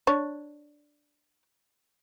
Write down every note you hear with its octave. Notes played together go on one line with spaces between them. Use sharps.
D4 C#5